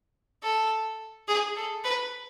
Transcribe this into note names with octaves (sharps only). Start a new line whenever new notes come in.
A4
G#4
A4
B4